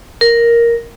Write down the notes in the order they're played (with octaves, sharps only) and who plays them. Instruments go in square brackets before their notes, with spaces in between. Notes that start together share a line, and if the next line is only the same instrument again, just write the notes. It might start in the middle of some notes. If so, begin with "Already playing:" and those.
[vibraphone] A#4